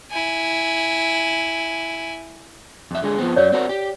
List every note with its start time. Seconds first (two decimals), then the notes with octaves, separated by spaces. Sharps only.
0.11 E4 G#5
2.91 F2 E5
3.03 D3 G#3 G#4
3.18 F3 B3 C4
3.36 F#2 F#3 C#5 D5
3.52 C4 F#4 A#4
3.69 G4